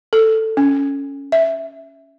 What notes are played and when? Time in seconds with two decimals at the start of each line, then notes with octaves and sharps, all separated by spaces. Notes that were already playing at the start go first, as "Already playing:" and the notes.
0.13 A4
0.57 C#4
1.32 E5